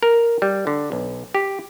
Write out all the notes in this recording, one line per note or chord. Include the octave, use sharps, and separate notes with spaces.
A#4
G3
D3
B1
G4